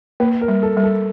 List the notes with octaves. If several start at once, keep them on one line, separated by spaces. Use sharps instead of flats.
A#3 B4
A#4
G3
A4
G3
A4